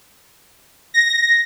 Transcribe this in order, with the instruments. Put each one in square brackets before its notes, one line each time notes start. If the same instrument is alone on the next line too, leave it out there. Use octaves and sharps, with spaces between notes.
[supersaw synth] A#6